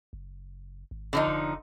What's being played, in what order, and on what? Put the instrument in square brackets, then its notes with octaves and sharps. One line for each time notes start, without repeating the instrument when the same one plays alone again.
[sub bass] F#1
G#1
[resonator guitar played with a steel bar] D3 F3 D#4
[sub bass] F1